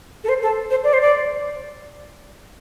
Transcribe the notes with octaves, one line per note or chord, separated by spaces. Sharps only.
A4
C5
A4
C5
D5
C5
D5